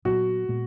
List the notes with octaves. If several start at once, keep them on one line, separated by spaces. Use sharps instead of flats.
A#2 F#3 B3 F#4
A#2 G#3 B3